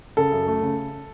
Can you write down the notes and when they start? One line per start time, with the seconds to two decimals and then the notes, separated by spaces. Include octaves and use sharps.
0.17 C#3 A4
0.32 F#2
0.47 A3
0.62 C#3